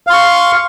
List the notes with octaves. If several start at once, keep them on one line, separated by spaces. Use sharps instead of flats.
F5 C6 C#6